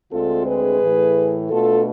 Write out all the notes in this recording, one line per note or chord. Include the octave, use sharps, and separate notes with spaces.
D2 D3 G#3 C4 F4 A4
G#4 B4
A2 E3 A3
B2 A3 D4 F4 A4